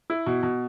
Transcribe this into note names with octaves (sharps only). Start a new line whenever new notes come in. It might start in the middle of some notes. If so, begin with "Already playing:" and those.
E4
B2
B2